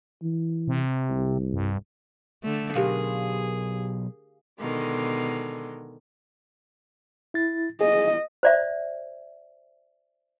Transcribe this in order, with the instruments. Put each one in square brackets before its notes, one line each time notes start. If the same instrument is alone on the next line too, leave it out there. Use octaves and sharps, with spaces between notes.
[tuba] E3
[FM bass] C3
[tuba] C2
[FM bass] G2
[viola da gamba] D3 A3
[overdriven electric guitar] B1 [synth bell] G4 A#4 F5 [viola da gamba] G#4
[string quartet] B2 D3 D#3 G#3
[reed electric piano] E4 A6
[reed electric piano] G#4 [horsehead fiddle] D#5
[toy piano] C5 D5 E5